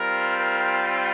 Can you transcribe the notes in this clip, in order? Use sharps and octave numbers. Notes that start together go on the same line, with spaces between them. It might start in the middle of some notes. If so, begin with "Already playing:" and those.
Already playing: G3 C4 F4 A#4
A#4